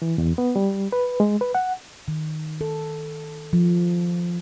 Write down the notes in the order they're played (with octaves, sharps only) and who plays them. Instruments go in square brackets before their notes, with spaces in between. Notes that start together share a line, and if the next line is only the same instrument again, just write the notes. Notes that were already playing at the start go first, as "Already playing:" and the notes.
[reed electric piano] E3
E2
B3
G3
B4
G#3
B4
F#5
[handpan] D#3
A4
F3